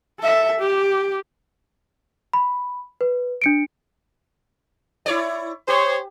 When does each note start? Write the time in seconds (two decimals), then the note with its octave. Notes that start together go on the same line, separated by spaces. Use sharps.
0.20 A4 E5
0.59 G4
2.33 B5
3.01 B4
3.42 D4 C#7 D7
5.06 E4 C#5 D5
5.68 G4 C5 C#5